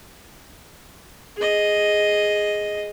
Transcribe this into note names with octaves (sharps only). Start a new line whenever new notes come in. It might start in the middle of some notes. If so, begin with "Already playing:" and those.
G#4 D#5